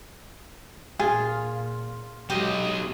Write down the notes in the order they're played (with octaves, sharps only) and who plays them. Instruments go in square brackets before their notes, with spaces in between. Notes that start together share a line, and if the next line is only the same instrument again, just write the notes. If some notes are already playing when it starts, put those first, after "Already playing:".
[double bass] A#2 [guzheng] F4 [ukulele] G#4
[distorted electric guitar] B1 D#5 [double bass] F#3 G#3 [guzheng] G4 C6